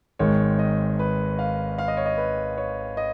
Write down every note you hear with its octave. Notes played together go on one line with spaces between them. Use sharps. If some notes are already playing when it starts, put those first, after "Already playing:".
G#1 G#2 D#3 G#3 C#5
D#5
B4
F5
F5
D#5
C#5
D#5
B4
C#5
D#5